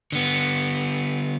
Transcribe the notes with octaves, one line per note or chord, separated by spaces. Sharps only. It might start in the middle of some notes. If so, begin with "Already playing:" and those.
D3 B3